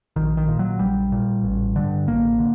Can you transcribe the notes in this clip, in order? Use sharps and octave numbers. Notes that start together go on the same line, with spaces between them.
A#1 D#3
D#3
A#2
F#3
A#1 G3
A#2
A1
G2 D3
A1 A#3
D3